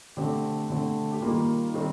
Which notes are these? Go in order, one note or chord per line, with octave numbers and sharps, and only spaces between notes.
D3 A3 C4 G4
D3 A3 C4
G4
D#3 G3 A#3 F4
D#3 G3 C4